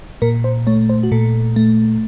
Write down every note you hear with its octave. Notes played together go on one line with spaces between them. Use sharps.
A#2 A#4
C5
A3 C#5
C5
F#4
A#2 A4
A3